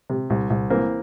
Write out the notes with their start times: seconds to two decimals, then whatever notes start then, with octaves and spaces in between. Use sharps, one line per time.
0.10 C3
0.30 C2
0.50 C2
0.70 E3 A#3 C4